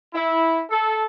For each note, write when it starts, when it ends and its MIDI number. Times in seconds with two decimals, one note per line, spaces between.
0.14 0.62 64
0.70 1.04 69